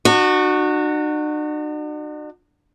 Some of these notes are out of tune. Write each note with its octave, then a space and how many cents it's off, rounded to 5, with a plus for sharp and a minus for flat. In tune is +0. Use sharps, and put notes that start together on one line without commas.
D4 +45 F#4 -5